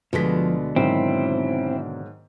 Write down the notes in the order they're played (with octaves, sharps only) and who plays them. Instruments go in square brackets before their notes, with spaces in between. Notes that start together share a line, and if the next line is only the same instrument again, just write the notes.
[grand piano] D2 B3 B6 [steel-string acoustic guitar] B2 D3 G#3 [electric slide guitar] F3
[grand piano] G#2 D#3 F#3 [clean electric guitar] C4 [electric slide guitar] E4